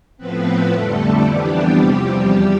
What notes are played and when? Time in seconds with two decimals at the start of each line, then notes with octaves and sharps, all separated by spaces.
0.17 A2 F3 B3 C4 B4
0.71 F2 D3 G3 A3 A4
1.23 F2 E3 G3 B3 D4 G4
1.76 E2 C3 F3 G3 G4
2.29 E2 G3 G4